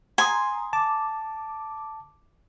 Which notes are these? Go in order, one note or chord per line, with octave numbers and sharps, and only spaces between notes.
G#5 A#5 C6 D#6
A5 D6